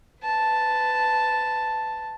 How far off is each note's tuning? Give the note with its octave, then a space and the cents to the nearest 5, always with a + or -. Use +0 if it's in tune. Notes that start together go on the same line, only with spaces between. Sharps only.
B4 +25 A5 +0